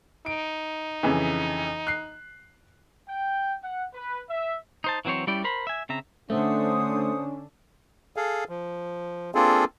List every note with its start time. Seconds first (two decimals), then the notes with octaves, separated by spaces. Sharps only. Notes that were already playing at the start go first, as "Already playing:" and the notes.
0.26 D#4 D7
1.03 F2 C#3 E3
1.87 F#6 C7
3.08 G5
3.64 F#5
3.94 B4
4.29 E5
4.84 D#4 C5 A5
5.05 E3 F#3 C4 C5 C#5
5.27 G3 C#4 E4 D5 G5
5.44 A#4 C5 B5
5.67 E5 G#5
5.89 C#3 C4 E5 A#5
6.30 D3 A3 C#4 D4 C5 F#5 D#6
8.16 G#4 A4 F5
8.49 F3
9.35 A#3 C4 D4 F4 G#4 A4